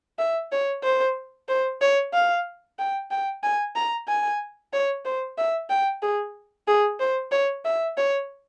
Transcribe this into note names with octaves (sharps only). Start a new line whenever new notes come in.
E5
C#5
C5
C5
C#5
F5
G5
G5
G#5
A#5
G#5
C#5
C5
E5
G5
G#4
G#4
C5
C#5
E5
C#5